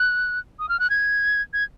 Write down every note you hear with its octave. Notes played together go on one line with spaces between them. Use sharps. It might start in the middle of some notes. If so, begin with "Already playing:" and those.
Already playing: F#6
D#6
F6
F#6
G#6
G#6